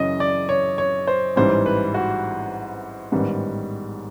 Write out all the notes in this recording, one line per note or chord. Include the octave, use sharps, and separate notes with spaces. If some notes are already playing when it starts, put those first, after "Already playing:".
Already playing: F#2 C#3 E3 D#5
D5
C#5
C#5
C5
A1 G#2 E3 G3 C5
B4
F#4
A1 G#2 D#3 G3 B3